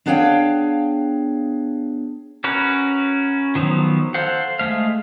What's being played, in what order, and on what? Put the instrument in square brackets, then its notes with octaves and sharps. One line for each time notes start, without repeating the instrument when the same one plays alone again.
[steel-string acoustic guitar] B3 D4 G#4 C#5 F5 G5
[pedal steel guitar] C#4 F#4 A#4 B4
D#3 F3 F#3 B3
A4 C5 F5 F#5
G#3 A3 F5